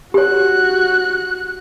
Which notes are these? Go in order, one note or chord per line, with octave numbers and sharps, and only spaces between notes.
F#4 G4 C#5 F#6